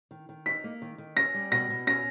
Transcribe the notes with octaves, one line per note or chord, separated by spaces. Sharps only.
D#3
D#3
D#4 B6
A#3
D#3
D#3
C#4 A#6
G3
B2 A#6
B2
C#4 A#6